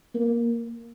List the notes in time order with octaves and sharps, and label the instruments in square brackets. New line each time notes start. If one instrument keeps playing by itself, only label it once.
[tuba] A#3